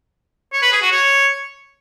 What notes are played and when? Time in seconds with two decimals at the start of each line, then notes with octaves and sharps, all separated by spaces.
0.53 C#5
0.62 B4
0.72 G#4
0.82 F#4
0.91 C#5